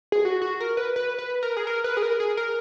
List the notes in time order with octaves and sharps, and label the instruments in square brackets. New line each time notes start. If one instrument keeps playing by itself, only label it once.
[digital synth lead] G#4
F#4
F#4
A#4
B4
B4
B4
A#4
G#4
A#4
B4
G#4
A#4
G#4
A#4